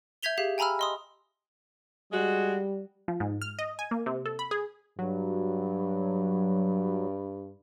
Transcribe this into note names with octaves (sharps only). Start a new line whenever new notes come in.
E5 G6 G#6 B6 F7 G7
G4 G#4 F5 B6
G5 G#5 A#5 B5 E6 F6
D#5 C6 D#6
G3 G#3 F#4
F3
G#2
F6
D#5
G#5
A#3
C3
A4
B5
G#4
G2 F#3